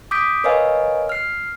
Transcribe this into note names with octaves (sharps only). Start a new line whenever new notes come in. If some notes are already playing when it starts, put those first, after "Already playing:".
D6 D#6 G6 B6 D7
A#4 B4 C#5 D#5 F5 G#5
F6 C7